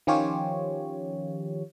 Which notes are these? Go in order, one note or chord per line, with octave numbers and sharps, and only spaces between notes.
D#3 F3 C#4 F4 G4 C#5